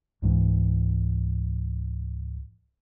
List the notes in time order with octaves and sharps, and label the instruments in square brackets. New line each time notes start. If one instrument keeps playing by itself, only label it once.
[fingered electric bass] C#2 G#2 E3